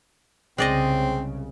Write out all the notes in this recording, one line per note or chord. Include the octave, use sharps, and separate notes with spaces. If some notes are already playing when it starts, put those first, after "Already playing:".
C2 C#3 G#3 C4 D5 D#5